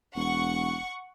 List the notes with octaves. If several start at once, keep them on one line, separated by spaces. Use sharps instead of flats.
E1 F#5 C#6